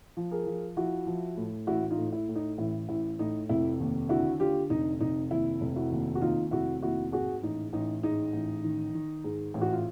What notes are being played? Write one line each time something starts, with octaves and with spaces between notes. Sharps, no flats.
F3
G#4 A#4
F3
F3 E4 F#4
F3
A2
A1 E4 F#4
D#4 F4
A2
E4
A2
D#4
A1 E4
A1 E4
A2 D#4
F1 E4
D#2
D3 E4 F#4
D3 F4 G4
F1 D#4
F1 D#4
D#2 E4
F1
E4 F#4
D#2
F#4
D#2 D#4 F4
F1 E4 F#4
D#2 E4 F#4
G#2 F#4 G#4
A1 D#4
A1 D#4
G#2 D#4
A1
D#3
D#3
G#2
A1
F#4
F4